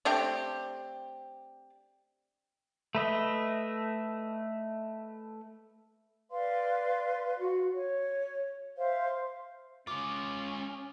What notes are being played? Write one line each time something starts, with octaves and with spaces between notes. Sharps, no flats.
A3 C4 D4 G4
A3 B4 D#5 E5
B4 D5 F5 C6
F#4
C#5
C5 E5 F5
G#3 C#4 F4 D6